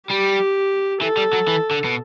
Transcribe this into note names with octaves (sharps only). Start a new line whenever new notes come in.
G3 G4
E3 A4
G3
F#3
E3
D3
B2